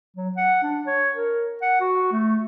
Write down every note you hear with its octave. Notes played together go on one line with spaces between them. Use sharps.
F#3
F#5
D4
C#5
A#4
F#5
F#4
A3